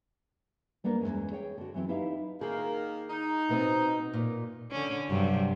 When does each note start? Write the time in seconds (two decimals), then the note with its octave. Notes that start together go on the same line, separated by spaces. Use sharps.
0.84 G3 A#3 B3 D4 A#4
1.01 E2 G#2 G#3 C#4
1.31 G#4 C#5 G5
1.58 D3 F#4
1.74 E3 F#3 C4 E4
1.88 D#4 E4 G4 B4 E5 F5
2.41 D#3 A#3 G#4
3.10 D#4
3.49 B2 B3 C4
4.13 A#2
4.72 D3 C#4
5.08 G2 C3 F#3